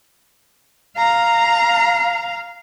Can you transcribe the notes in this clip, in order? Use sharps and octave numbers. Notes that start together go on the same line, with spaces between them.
F5 A#5